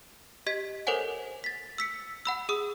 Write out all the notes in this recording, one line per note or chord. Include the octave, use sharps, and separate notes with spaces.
G4 D#5 G#6 B6
A4 A#4 C5 C#5 F#5 G#5
A6 B6
E6 B6 C#7
F#5 B5 E6
G#4 D#6 E6